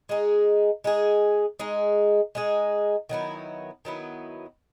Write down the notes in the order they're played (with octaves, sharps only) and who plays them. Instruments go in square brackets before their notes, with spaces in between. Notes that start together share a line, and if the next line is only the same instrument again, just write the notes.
[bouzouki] G#3 D#4 G#4
G#3 D#4 G#4
G#3 D#4 G#4
G#3 D#4 G#4
D#3 F#3 B3 E4
D#3 F#3 B3 E4